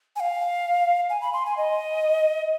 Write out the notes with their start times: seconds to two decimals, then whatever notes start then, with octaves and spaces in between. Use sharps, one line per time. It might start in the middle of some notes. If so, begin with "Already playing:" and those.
0.16 G#5
0.20 F5
1.10 G#5
1.22 B5
1.33 C6
1.46 G#5
1.57 D#5